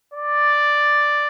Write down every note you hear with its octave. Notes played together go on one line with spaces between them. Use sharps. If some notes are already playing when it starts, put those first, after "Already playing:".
D5